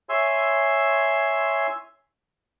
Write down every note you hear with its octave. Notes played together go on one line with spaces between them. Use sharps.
C#5 E5 G#5 C6 E6